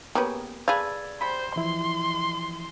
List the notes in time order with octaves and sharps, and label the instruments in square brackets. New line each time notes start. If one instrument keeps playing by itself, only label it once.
[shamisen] A#3 G4 B4 [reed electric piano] B3 [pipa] C#4 G#4
[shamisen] G#4 F5 [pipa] A4 B4 [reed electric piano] D5 G#6 A6
[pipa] C3 B5 [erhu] C5
[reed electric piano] E3 F3 E4 [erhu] C6